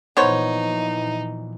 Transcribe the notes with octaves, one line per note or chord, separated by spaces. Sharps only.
A#2 E3 F3 B3 D#4 C5 C#5